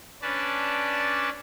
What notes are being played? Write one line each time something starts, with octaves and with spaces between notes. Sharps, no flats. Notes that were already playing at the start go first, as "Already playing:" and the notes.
C#4 D4 B4 D5 A5